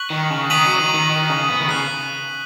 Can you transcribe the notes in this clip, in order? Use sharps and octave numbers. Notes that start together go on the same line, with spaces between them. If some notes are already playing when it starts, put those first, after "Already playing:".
Already playing: C#6 F#6 B6 F#7
D#3
C#3
D#3 D#6 B6 D#7 F#7
F#3
D#3
D#3
D#3
C#3
B3
D#3
C#3 D#6 F#6 B6